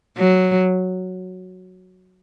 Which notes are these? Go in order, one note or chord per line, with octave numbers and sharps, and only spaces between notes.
F#3